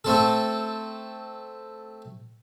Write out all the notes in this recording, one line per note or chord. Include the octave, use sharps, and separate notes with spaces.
A3 C4 A4